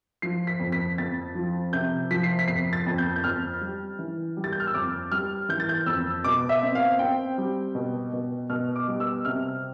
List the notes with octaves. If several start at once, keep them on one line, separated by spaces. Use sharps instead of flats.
F3 C7
B6
F2
B6
F2 A6
F3
C3 G6
F3 B6
C7
B6
F2 C7
A6
F2
G6
G6
F2 F6
G3
E3
G3
A6
G6
F6
E6
F2 D6
G3 F6
E3 G6
A6
G6
F2 E6
B2 D6
E5
C4
F5
C4 G5
G3
B2
B2
B2 F6
D6
G3
E6
C3 F6